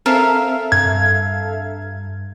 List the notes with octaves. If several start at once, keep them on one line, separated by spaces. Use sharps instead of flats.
C4 A4 A#4 E5 F5
G2 G#6